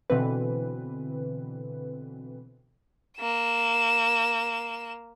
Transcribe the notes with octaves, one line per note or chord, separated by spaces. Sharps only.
B2 D3 E3 C4 B4
A#3 E7